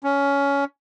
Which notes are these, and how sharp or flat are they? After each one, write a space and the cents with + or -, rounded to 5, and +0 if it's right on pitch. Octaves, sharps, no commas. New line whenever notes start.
C#4 +15